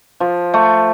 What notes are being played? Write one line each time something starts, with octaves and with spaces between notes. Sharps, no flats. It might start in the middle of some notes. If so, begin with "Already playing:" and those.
F3
A3